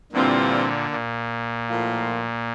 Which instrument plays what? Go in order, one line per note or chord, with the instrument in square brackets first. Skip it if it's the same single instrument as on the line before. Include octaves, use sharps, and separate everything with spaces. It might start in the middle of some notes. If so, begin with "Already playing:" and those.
[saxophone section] G2 E3 G3 C4 F4 [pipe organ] A#2 D3
[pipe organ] A#2
[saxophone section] A2 F3 A#3 F4